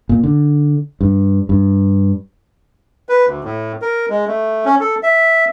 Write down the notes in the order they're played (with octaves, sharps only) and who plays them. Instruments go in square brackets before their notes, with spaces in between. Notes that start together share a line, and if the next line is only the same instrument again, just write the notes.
[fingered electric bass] A#2
D3
G2
G2
[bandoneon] B4
D2
A2
A#4
G#3
A3
C#4
A4
E5